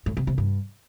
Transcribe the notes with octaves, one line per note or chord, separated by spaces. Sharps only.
A2
C3
C3
G2